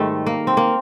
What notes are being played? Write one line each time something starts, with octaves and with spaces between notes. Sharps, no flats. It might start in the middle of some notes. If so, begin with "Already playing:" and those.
Already playing: G#2 D#3 G3 A3
A#3
C4
A#3